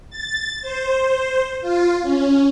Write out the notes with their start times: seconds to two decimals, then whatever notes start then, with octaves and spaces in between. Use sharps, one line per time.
0.10 A6
0.62 C5
1.61 F4
2.02 C#4